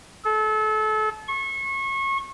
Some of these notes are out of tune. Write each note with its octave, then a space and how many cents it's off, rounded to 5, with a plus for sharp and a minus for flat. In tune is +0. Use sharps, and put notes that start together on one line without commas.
A4 -30
C#6 -30